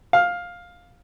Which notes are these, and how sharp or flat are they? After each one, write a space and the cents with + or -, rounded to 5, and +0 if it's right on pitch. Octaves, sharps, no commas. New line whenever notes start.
F5 +10